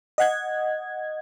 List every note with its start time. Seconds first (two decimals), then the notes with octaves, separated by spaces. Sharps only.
0.18 D#5 F#5 G#6